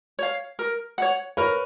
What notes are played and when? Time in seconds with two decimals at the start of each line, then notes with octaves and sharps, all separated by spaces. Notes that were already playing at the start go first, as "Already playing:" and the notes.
0.19 C#5 F5
0.59 A#4
0.98 C#5 F#5
1.37 A#4 B4 C#5